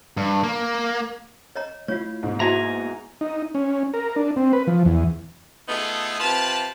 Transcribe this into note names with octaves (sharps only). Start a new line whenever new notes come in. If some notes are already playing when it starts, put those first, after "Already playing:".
G2
A#3
C#5 D#5 A#5
A3 E4 F4 C#5 F5
G#2 B2
A#3 E4 F#4 B4 E5 F#5 G#5 A#5
D#4
C#4
A#4
D4
C4
B4
F3
E2
A3 B3 D#4 F4 G#4 A4
C3 F4 B4 A5